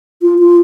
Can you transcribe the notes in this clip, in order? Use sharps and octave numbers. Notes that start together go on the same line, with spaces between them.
F4
F4